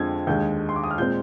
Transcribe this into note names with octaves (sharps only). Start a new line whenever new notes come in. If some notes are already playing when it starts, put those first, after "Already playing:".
Already playing: F2 D3 G#3 C4 G#6
D#2 D3 G#3 G6
C6
D6
D#6
F6
A#2 G#3 C4 G6